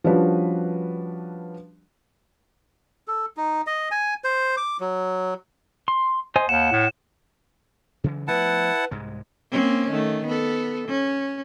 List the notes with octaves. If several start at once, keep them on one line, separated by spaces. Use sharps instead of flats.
F3 G3 C#4 D4 F#4 B4
A4
D#4
D#5
G#5
C5
D6
F#3
C6
C5 D#5 G#5
D#2 F#5 E7
A2
C#3 E3 F#3
F3 A3 B3 E4 B4 F#5 A5
C2 G#2 G#3
A#3 C4 C#4
D#3 A3
B3 A4
C#4